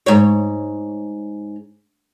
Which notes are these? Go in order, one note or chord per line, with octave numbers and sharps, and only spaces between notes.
G#2 C#5